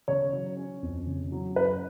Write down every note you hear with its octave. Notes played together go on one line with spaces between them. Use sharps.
C#3 C#5
F#3
C#4
F2
C#3
F#3
F#2 B4